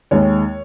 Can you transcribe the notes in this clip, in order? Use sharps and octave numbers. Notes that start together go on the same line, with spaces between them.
D#2 D#3 G#3 C#5